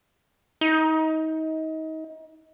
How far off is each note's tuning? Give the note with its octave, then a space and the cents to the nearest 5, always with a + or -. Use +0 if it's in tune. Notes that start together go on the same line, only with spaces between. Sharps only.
D#4 +30